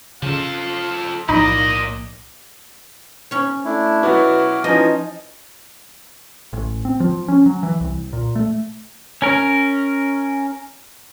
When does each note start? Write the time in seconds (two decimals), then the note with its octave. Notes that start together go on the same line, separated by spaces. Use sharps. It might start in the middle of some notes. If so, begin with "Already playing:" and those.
0.22 C#3 F3 A4 F5
1.29 B1 A2 F3 A#3 D#4 D5 D#5 B5
3.31 C#4 C#5
3.65 A3 D4 E4
4.03 B2 F#3 B3 E4 F#4 D6 F6
4.64 E3 F3 C#4 D#4 D#5 G#5
6.53 A1
6.85 C4
7.00 F3
7.28 C#4
7.46 F#3
7.63 E3
7.80 C2
8.13 A#2
8.36 A3
9.22 C#4 A#4